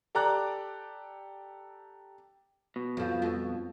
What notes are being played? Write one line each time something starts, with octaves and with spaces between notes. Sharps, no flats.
G4 A4 D5 A#5 D6 F#6
B2
F2 F3
F2